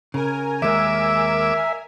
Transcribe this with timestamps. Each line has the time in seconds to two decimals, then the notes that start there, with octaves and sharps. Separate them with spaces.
0.14 C#3 A#4 G#5
0.62 D#2 G#3 E5 D6 E6